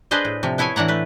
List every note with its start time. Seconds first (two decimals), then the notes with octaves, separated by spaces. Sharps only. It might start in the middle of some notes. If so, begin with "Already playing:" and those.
0.11 D4 G#4 B4 C5 D#5
0.25 A2
0.43 C3 F3
0.58 B3 E4 A4 C#5 G#5
0.76 A2 E3 D4 F#5 A#5
0.88 A3 B4